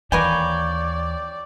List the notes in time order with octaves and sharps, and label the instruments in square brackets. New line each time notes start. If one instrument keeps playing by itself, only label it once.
[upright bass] D#2 E3 [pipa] A#3 B4 G#5 [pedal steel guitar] C#5 G5 [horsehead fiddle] D5